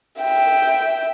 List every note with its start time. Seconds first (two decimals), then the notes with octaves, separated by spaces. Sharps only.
0.21 E5 G5